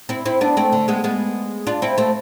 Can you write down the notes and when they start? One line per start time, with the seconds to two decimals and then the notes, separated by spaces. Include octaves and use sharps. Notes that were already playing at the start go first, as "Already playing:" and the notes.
0.09 C4 E4
0.25 C4 E4
0.41 B3 D4
0.57 A3 C4
0.72 D3
0.88 G#3 B3
1.04 G#3 B3
1.67 D4 F4
1.82 C4 E4
1.98 A3 C4